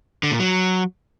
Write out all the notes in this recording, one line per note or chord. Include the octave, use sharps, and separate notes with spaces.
D3
A#2
F#3